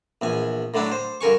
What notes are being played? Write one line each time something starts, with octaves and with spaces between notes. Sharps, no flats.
A#1 E2 G#5
A2 D3 F#3 D4 E4
C5
G2 D3 A#4 G#5 C#6